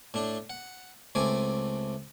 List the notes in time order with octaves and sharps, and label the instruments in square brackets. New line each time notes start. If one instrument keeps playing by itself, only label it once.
[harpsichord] A2 D4
F#5
C#2 A3 C4 G#5 D6